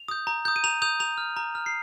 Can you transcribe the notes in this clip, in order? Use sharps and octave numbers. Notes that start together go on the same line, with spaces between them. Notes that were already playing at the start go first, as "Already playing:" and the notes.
Already playing: F7
D#6 G6
A#5
D#6 G6
D#7
A#5 F7
D#6 G6 F7
A#5 F7
F6
A#5
F6
C7